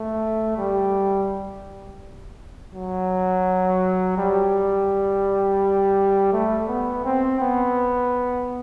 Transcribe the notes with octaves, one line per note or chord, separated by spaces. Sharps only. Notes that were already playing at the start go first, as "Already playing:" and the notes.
Already playing: A3
G3
F#3
G3
A3
B3
C4
B3